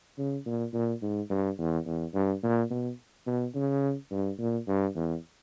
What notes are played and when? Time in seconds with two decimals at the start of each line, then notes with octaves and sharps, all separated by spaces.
0.18 C#3
0.46 A#2
0.73 A#2
1.02 G#2
1.30 G2
1.58 E2
1.86 E2
2.14 G2
2.43 A#2
2.70 B2
3.27 B2
3.55 C#3
4.11 G2
4.39 A#2
4.67 G2
4.95 E2